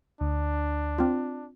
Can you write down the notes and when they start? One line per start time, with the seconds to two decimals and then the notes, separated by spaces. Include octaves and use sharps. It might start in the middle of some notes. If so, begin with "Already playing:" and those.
0.21 D2 D4
0.98 C4 F4